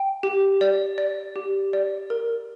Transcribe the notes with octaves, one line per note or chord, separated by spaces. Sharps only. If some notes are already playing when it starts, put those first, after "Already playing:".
Already playing: G5
G4
D5
D5
G4
D5
A#4